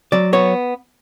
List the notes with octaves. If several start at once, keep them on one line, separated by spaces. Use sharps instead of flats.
F#3 D5
B3 C#5